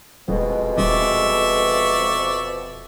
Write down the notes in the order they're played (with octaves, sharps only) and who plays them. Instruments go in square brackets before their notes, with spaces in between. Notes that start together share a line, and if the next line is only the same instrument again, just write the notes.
[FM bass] D#1 [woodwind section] F2 B2 [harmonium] G#3
[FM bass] D#1 [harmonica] D5 E5 C#6